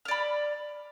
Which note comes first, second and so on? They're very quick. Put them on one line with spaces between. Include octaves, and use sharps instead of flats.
F6 D5 B5